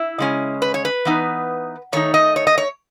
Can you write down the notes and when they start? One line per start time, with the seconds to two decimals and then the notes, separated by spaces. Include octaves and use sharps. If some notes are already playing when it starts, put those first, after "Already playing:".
Already playing: E4
0.19 C#3 G#3 C#4
0.62 B4
0.74 C#5
0.85 B4
1.05 E3 B3 D#4
1.92 D#3 A3 D#4 C#5
2.14 D#5
2.36 C#5
2.47 D#5
2.58 C#5